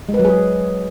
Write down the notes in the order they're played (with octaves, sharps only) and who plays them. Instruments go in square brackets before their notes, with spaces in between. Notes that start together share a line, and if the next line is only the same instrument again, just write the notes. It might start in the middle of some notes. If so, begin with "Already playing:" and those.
[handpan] G#3
B4
F#3
G#4